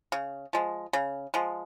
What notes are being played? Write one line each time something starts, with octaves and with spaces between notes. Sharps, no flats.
C#3
F3 G#3
C#3
F3 G#3